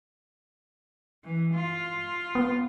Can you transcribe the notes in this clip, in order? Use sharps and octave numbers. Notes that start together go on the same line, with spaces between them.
E3
F4
B3